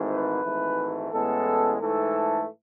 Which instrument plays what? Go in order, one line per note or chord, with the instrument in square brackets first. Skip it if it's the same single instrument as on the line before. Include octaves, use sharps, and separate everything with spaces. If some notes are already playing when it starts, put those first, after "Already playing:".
Already playing: [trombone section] G#1 G#2 E3 A3
B4
G#1 G#2 E3 A3
A1 A2 G#3 B3 A4
G#2 E3 A3 A4